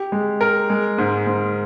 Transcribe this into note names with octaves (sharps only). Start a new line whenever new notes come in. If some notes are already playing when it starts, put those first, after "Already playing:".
Already playing: G4
G#3
A#4
G#3
G#2
G#2